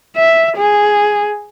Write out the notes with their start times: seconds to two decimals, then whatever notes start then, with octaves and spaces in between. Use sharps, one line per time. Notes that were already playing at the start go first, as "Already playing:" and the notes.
0.17 E5
0.57 G#4